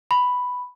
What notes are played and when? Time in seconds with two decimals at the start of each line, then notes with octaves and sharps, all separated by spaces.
0.11 B5